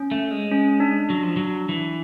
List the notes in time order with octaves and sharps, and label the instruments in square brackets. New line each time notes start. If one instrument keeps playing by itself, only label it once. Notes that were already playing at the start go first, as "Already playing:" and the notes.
Already playing: [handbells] C#4
[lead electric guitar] A3
G#3
[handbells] C#4
D4
[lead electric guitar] F#3
F3
F#3
E3